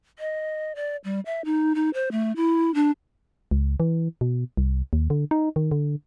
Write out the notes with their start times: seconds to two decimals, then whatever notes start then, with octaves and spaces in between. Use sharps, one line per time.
0.19 D#5
0.76 D5
1.04 G3
1.26 E5
1.45 D#4
1.75 D#4
1.94 C5
2.12 A3
2.36 E4
2.74 D4
3.51 C#2
3.80 E3
4.21 B2
4.57 C2
4.93 D#2
5.10 D3
5.31 D#4
5.56 D#3
5.71 D3